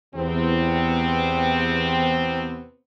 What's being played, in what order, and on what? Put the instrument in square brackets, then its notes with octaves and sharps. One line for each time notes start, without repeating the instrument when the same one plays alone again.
[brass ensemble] E2 [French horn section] C3 B3 C4